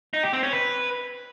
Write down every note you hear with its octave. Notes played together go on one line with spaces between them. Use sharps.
D#4
G4
C4
C#4
B4